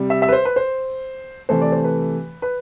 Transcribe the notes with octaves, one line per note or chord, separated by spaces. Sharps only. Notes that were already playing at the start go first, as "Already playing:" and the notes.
Already playing: C3 G3
E5
E5
B4
C5
B4
C5
C3 E3 A3 C5
D5
C5
B4
B4